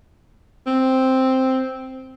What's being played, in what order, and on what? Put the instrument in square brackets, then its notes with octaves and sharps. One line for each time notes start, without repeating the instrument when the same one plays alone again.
[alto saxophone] C4